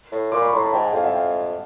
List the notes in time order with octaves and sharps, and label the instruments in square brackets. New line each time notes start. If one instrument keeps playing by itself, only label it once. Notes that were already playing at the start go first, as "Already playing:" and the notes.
[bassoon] A2
[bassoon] A#2 [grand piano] C6 D6
[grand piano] B5 C#6
[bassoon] A2 [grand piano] A#5 C6
[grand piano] A5 B5
[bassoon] G#2 [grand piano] G5 A5
[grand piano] F#5 G#5
[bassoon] F2 [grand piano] F5 G5
[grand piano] E5 F#5
F5 G5